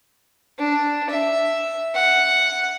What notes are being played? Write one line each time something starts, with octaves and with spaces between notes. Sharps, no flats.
D4
E5
F#5